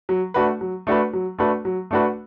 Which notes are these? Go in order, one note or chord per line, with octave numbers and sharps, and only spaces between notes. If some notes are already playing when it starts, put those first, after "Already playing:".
F#3
A3 D4 F#4 B4
F#3
A3 D4 F#4 B4
F#3
A3 D4 F#4 B4
F#3
A3 D4 F#4 B4